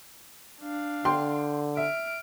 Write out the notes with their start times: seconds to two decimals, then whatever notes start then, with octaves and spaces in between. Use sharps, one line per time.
0.61 D4 F5
1.05 D3 G5 C6
1.77 E5 F6 D7